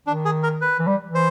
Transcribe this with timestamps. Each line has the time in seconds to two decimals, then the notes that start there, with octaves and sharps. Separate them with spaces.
0.07 D#3 D4
0.25 G#4
0.43 A#4
0.61 B4
0.79 E3
0.87 G3
1.05 E3
1.15 C5